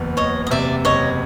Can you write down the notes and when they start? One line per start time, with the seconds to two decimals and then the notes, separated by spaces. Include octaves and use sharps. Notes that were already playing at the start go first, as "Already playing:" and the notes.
Already playing: F#1 E2
0.17 F#1 C#5 D#5
0.47 D#5
0.51 C3 D5 E5
0.85 F#1 C#5 D#5